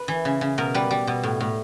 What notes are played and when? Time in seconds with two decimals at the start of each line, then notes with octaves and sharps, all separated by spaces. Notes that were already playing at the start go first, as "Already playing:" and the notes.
Already playing: B4
0.08 E3
0.25 C#3
0.41 C#3
0.58 B2 A#4
0.74 G3 B4
0.91 G3
1.07 B2
1.23 A2
1.40 A2